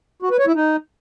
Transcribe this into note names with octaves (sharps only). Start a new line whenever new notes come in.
F#4
B4
C#5
E4
D#4